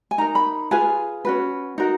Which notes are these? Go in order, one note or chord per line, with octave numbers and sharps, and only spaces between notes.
G#5
D#4 A#4 A#5
B5
F4 G#4 B4 G#5
C#4 F#4 B4
D#4 F#4 A#4